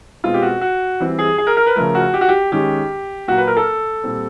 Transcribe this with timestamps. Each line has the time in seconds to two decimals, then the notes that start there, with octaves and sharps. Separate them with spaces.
0.24 B2 G#3 C4 F4
0.34 G4
0.42 F#4
0.61 F#4
1.00 E3 G3 C4
1.19 G#4
1.38 G#4
1.47 A#4
1.57 A#4
1.66 B4
1.76 C#3 F3 A3 A#4
1.95 F#4
2.14 G4
2.21 F#4
2.29 G4
2.52 D#3 G#3 C#4 G4
3.28 A#2 F#3 A#3 F#4
3.38 B4
3.47 A#4
3.57 A4
4.04 A#2 G3 C4